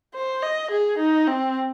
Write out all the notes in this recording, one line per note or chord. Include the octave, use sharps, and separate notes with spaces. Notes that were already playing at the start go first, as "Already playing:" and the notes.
C5
D#5
G#4
D#4
C4